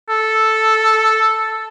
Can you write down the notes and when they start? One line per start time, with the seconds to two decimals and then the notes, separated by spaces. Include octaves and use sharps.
0.09 A4